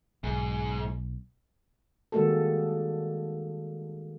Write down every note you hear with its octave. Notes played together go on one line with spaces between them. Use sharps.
B1 G#2
D#3 G3 G#3 A#3 F#4 A4